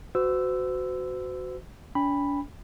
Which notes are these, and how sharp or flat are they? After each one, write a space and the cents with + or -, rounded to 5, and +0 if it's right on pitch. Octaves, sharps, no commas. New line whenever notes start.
F#4 +0 C5 -45 E6 +0
D4 -45 G5 +35 B5 +0